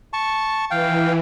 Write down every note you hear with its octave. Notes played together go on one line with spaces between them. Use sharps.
A5 C#6
E3 F5 G5